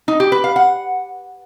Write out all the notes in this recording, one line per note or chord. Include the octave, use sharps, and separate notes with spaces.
D#4
G4
B4
F5
F#5